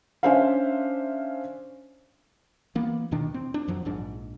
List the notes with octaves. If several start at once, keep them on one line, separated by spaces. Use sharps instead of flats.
C#4 D4 C5 E5 F5
E3 A#3 B3
E2 B2 D#3 D4
C4
D4
F#2 F3 F#3
A#1 G#2 D4